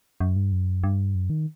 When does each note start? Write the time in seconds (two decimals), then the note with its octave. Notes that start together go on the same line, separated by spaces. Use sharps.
0.20 F#2
0.36 G2
0.52 F#2
0.84 G2
1.15 F#2
1.30 D#3